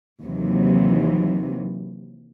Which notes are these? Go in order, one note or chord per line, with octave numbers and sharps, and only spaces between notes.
D#2 C3 E3 F#3